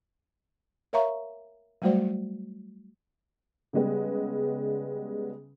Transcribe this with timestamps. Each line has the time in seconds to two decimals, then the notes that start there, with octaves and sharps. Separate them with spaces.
0.93 A#4 C#5 E5 F5 A#5 C#6
1.82 F#3 G3 A3 F#4 C5 D5
3.73 C#3 G3 G#3 B3